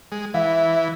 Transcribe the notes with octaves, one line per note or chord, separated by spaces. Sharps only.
G#3
E3 E5